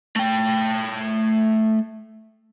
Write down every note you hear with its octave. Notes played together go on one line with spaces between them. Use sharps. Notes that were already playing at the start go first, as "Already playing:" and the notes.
A3 G5